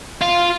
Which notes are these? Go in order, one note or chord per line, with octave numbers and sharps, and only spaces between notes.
F4